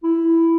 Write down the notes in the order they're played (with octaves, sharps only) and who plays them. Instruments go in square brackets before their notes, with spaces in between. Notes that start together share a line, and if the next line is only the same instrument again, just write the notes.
[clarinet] E4